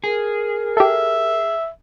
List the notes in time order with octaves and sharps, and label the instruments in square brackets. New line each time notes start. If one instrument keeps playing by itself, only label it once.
[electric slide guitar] G#4 [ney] A#4
[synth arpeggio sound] G4 A4 [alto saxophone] E5